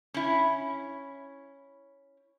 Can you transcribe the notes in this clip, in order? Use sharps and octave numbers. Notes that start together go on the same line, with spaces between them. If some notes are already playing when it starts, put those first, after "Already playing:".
C#4 E4